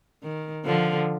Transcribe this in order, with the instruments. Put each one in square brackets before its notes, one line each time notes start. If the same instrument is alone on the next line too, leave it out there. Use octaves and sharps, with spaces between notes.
[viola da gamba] D#3
D3 F3